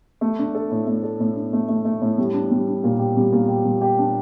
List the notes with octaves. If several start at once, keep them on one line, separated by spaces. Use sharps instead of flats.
A3
D4
A4
A2
A3
A4
A2
D4
A3
A3
A3
A2
G3
D4
G3
D4
A#2
G4
G3
A#2
G4
G3
G4
D4